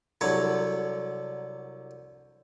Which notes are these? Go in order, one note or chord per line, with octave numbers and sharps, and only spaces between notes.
C2 D3 F#3 C#5